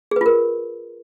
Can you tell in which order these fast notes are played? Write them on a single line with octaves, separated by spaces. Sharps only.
G#4 B4 F4 A#4